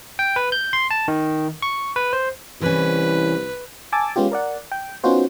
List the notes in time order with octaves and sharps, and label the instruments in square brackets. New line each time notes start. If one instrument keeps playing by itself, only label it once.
[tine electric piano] G5
B4
G6
C6
A5
D#3
C#6
B4
C5
[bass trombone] C2 [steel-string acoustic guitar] E3 C#4 [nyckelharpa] B4
[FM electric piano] G#5 A5 D6 E6 A6
G#3 B3 C#4 F4 G4
A#4 D5 F#5
G5
B3 C#4 D#4 F4 F#4 C5